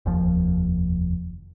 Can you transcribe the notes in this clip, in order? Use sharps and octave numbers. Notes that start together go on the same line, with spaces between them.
F1 D#2 F3